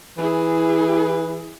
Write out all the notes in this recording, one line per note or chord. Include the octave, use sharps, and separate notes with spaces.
E3 E4 G#4